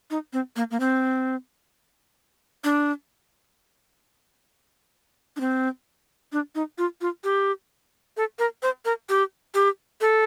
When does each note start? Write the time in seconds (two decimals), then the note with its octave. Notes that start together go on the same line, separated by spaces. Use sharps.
0.11 D#4
0.33 C4
0.56 A#3
0.71 A#3
0.80 C4
2.64 D4
5.36 D4
5.40 C4
6.32 D4
6.55 D#4
6.78 F4
7.01 F4
7.24 G4
8.17 A4
8.39 A#4
8.63 C5
8.85 A#4
9.09 G4
9.55 G4
10.01 A4